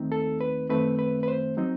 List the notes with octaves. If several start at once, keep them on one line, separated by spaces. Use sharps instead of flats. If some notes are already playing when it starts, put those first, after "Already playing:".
Already playing: D#2 D#3 A3 C4 D#4
A4
B4
F#2 D#3 A3 C4 B4
B4
B4
C5
F#3 C4 D#4